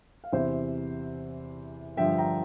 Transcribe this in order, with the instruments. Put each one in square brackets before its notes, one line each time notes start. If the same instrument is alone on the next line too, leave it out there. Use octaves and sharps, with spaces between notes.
[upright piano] F5
E2 C3 E3 C5 E5
G2 D3 F3 E5 G5
G5 A#5